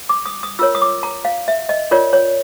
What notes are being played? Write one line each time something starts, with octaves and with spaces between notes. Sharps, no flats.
D6
D#6
D#6
F4 A#4 C#5 E6
D#6
D6
A#5
F5
E5
D#5
F4 A#4 C#5 D5
C#5